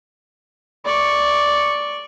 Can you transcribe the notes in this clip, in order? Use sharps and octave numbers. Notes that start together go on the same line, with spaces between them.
D5 C#6